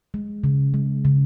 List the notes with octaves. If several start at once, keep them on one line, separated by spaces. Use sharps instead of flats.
G#3
C#3
G#3
C#3